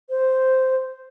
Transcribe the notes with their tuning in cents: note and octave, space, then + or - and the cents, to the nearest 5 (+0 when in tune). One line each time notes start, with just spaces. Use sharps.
C5 -5